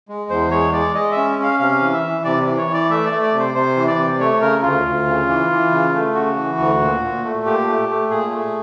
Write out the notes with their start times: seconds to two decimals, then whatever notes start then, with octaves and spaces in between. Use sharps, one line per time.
0.08 G#3
0.29 E2 C5
0.51 G#3 C#5
0.72 G#3 D5
0.95 G#3 D#5
1.11 E5
1.17 C#4
1.39 C#4 F5
1.60 C3 F5
1.82 E3
1.93 E5
2.04 E3
2.24 C3 D5
2.46 E3
2.58 C#5
2.68 E3
2.73 D5
2.90 A3 E5
3.06 D5
3.12 A3
3.22 D5
3.34 C3
3.39 C5
3.54 C3 C5
3.77 E3
3.87 D5
3.98 C3
4.19 A3 C#5
4.41 C#3 A#4
4.63 D2 F4
4.86 D2
5.07 C#3
5.29 E3
5.50 E3
5.71 C#3
5.94 A3
6.15 C#3 F#4
6.36 E3
6.58 D2
6.81 A#2
7.01 A#2
7.24 A3
7.45 A#2 G4
7.67 A3
7.89 A3
8.10 A#2 G#4
8.32 A3